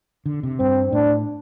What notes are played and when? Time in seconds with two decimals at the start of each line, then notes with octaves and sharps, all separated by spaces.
0.26 D3
0.43 C3
0.59 G2 C4
0.92 A2 D4